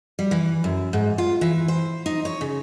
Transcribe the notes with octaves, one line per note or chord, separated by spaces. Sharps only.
G3
E3
F#2
G#2
F4
E3
C5
D#4
C#5
C#3